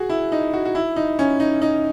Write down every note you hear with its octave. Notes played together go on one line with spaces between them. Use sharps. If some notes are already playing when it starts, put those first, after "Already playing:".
Already playing: F#4 G#4
E4
D#4
F#4
F#4
E4
D#4
C#4
D#4
D#4